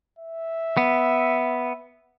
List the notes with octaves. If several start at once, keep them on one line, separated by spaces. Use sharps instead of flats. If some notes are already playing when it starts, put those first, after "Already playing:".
E5
B3